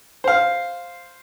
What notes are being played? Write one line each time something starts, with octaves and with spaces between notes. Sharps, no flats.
C5 F5